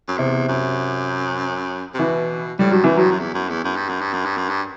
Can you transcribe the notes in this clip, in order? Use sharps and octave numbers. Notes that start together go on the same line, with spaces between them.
F#2
E2 C3
F#2
C3
B2 E3
A2 G3
G2 F#3
F#2 E3
G2 F#3
F#2
E2
F#2
E2
F#2
G2
F#2
G2
F#2
G2
F#2
G2